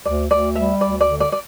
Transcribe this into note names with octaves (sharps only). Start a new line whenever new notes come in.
D2 D5
D2 D5
G3 E5
D2 D5
D5
D3
D5
D5